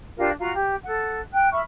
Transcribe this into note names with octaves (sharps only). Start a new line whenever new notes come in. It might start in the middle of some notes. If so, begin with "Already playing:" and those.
D4 F4 G4 A#4
F4 F#4 A#5
G4
A4 F#5
G5 F#6
E5 B5 C#6 F6